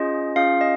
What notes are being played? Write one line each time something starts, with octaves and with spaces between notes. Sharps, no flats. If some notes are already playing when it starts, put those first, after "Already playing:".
Already playing: C#4 F4 G#4 D#5
C#4 F4 G#4 F5
D#5